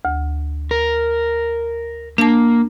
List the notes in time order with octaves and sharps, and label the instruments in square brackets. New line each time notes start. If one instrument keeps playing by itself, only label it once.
[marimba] D2
[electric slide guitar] A#4
[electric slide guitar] A#3 [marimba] D4 A5